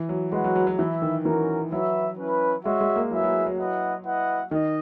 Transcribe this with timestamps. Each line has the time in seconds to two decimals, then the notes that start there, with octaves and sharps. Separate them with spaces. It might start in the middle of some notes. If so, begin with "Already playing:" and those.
Already playing: E3
0.09 F#3
0.32 G#3 F#4 B4 F#5
0.44 F#3
0.56 F#3
0.67 F#3
0.79 E3 E4 B4 E5
1.02 D#3
1.25 E3 C#4 F#4 A#4
1.72 F#3 F#4 B4 E5
2.18 C#4 E4 B4
2.65 G#3 F#4 C#5 E5
2.81 G#3
2.96 A#3
3.11 F#3 E4 G#4 B4 E5
3.23 F#3
3.46 F#3
3.58 E4 B4 D#5 F#5
4.04 E4 B4 D#5 F#5
4.51 D#3 D#5